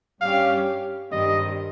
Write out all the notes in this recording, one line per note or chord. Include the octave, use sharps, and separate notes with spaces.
G2 G3 C#4 G4 C#5 F5
G2 D#3 G3 C4 D#5